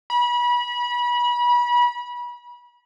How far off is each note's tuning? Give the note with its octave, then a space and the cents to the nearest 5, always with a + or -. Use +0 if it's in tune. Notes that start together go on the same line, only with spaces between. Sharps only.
B5 -30